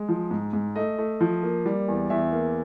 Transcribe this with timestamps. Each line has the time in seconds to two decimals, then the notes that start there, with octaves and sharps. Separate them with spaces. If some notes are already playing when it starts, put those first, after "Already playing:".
Already playing: G#3
0.09 F3
0.31 G#2
0.53 G#2
0.76 A3 D#5
0.98 A3
1.21 F3
1.43 A#3
1.66 G3
1.88 E2
2.10 E2 E5
2.32 A#3